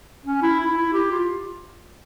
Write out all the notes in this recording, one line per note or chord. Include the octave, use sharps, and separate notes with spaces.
C#4
E4
E4
E4
G4
F4